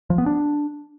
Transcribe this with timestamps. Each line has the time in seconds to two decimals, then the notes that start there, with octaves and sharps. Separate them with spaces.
0.10 F3
0.18 B3
0.26 D4